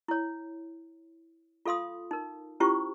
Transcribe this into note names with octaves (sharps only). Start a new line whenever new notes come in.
E4 C#5
F4 A4 F5 C6 D#6
D#4 A#4
C#4 E4 F4 G4 C5 C#6